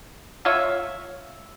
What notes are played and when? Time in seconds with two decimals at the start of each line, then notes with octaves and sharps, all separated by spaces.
0.45 F4 C#5 E5